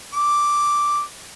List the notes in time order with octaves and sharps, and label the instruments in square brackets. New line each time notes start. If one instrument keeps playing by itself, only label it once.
[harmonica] D6